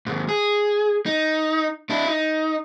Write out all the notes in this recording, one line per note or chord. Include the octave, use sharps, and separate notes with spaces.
D#2 G#2
G#4
D#4
D4 E4
D#4